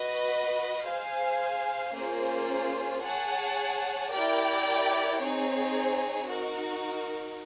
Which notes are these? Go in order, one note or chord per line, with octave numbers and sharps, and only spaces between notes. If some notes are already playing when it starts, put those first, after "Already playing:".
Already playing: F#4 B4 D#5
G#4 C5 F5 G#5
A#3 C#4 F4 G#4 C5
G#4 C#5 F#5 A5
E4 G4 A#4 D5 G5
C4 D#4 G#4 C#5
D#4 F#4 A#4